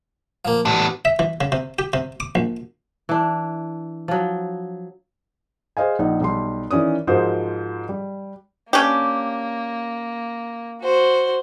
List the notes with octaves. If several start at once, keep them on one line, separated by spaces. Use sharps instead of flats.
F3 A#3
A1 B3 D4
E5
E3
C#3
C3
G4
C3
D6
A#1
E3 D4
F3 F#3
G#4 C5 D#5 F5 G#5
A#1 D#4 F#5
B1 G3 C6
D#3 E3 C#4 D5 D#6
G#2 F3 F#4 A#4 C5 D#6
G3
A#3 C#4 D4 G4
F#4 C5